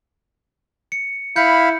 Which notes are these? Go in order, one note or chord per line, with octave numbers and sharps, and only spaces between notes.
C#7
E4 F5 B5 G6 C#7